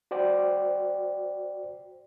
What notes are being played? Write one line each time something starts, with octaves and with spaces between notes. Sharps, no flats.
F#4 C5 D5 G5